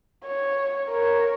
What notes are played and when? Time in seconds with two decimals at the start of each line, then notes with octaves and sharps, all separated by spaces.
0.24 C#5
0.87 A#4 C#5